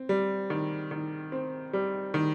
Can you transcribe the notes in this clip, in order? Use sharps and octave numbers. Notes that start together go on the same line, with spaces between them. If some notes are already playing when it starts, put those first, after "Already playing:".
Already playing: C4
G3
D#3
D#3
C4
G3
D#3